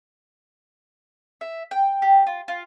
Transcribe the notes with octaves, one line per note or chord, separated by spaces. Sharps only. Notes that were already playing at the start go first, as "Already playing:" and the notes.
E5
G5
G4
F4
F4